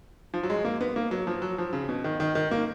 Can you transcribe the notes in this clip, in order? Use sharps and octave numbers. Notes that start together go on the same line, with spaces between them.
F3
F#3
G#3
A#3
B3
A#3
F#3
F3
F#3
F3
C#3
B2
D#3
D#3
D#3
A#3